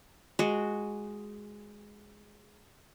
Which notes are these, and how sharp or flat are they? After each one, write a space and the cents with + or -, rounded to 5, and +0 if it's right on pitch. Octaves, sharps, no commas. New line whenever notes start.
G#3 +0 F#4 +0